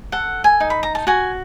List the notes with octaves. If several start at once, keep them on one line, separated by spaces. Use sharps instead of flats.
A4 F#5
G#5
D#4
B5
A#5
A5
F#4 G#5